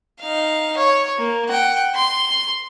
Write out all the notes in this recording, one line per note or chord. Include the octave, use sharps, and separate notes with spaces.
D#4 F5
C#5
A#3
F#5 G5
C6